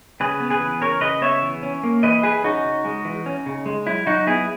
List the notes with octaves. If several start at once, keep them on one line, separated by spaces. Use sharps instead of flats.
C#3 G#4 B4
B3
G#4 B4
E3
C#3 A#4 C#5
C#3 B4 D#5
B3 C#5 E5
E3
C#4
A#3
E3 B4 D#5
E3 G#4 B4
C#4 D#4 F#4
C#3
G#3
E3
C#4
C#3
G#3
F#3 E4
F#3 D#4 F#4
B3 E4 G#4